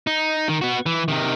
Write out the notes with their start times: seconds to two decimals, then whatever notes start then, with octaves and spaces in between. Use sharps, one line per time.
0.07 D#4
0.49 D#3
0.62 B3 F#4
0.86 E3
1.08 C3 D#3